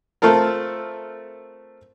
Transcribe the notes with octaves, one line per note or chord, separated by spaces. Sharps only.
A3 C4 F4 A4 A#4